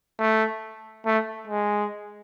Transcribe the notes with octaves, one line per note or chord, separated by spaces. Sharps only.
A3
A3
G#3